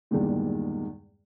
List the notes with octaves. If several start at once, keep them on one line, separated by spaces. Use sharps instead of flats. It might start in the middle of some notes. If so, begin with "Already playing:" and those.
E2 G2 A#2 D#3 G#3